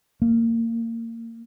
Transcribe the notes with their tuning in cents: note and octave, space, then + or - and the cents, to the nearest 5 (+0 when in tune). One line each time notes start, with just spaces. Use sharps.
A#3 -25